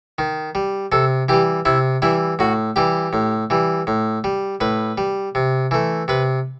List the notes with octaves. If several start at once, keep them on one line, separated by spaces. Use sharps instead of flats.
D#3
G3
C3 A4
E3 G3 G4
C3 E4
E3 G3 E4
A2 F#4
E3 G3 G4
A2
E3 G3
A2
G3
A2 B4
G3
C3
E3 A3
C3 B4